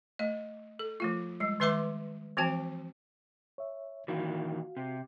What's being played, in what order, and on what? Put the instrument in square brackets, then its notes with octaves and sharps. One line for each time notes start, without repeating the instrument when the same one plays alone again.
[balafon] A3 D#5
A4
F3 A3 F4
G3 G#3
D#3 G#3 B4 E5 C6 D6
E3 F3 C4 F#4 A5
[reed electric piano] C#5 E5
[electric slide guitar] A#2 D#3 E3 [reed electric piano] F#4 F5
[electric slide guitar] C3